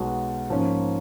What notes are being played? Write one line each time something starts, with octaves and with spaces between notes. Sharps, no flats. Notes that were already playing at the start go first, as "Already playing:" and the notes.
Already playing: B1 B2 G#3 B3 F#4
G#2 F3 A#3 C#4